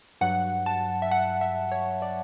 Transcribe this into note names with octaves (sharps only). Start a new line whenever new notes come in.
G2 F#3 F#5
A5
E5
F#5
E5
C#5
D5